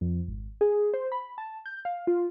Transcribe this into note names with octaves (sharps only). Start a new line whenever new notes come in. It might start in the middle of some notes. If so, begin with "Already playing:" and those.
F2
G#1
G#4
C5
B5
A5
G6
F5
F4